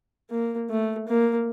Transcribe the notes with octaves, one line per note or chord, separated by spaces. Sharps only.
A#3
A3
A#3